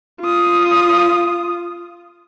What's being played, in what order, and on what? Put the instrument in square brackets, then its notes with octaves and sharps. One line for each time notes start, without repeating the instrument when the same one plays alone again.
[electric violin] F4 D#6